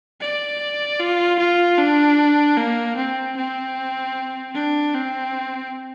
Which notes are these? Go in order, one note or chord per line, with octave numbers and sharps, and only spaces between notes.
D5
F4
F4
D4
A#3
C4
C4
D4
C4